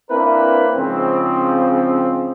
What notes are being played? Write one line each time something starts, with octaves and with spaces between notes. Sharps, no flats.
A#3 C4 D4 E4 A#4 B4
G#2 C#3 F3 C4